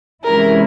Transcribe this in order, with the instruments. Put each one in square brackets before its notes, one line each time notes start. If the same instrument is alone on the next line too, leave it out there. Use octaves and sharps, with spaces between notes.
[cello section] C3 E3 G#3 C#4 E4 [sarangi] A#4